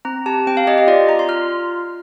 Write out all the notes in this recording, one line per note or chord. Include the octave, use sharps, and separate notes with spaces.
C4 A#5
G4 A5
C4 G5
F5
G4 D#5
D#5
F4 D5
F4 A#5
C6
F4 F6